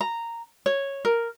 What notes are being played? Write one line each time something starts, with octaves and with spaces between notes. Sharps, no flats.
A#5
C#5
A#4